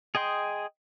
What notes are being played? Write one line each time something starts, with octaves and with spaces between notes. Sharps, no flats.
G#4 D#5 G5 C6